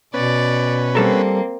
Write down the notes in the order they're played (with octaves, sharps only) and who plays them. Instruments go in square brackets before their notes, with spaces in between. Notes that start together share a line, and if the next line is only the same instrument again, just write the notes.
[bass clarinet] B2 [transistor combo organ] B3 C#4 B4 [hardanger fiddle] D5
[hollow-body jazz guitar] G3 A4 A#4 [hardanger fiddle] A#3 C4